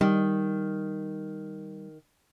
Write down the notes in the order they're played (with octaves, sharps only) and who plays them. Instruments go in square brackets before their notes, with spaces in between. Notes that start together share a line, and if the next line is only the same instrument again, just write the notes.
[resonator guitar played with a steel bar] D#3 [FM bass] G3